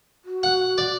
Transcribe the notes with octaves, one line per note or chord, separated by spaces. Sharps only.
F#4
F#5
D5